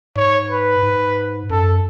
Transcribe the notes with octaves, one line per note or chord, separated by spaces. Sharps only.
G#2 C#5
B4
G#2
F#2 A4